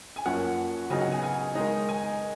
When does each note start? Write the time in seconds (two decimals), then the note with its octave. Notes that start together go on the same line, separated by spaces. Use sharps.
0.16 G#5
0.25 F#2 F3 A#3 C#4 F#5
0.90 C#3 F#3 B3 D#4 G#5
1.01 F#5
1.12 G#5
1.23 G#5
1.55 D#3 G#3 D#4
1.89 G#5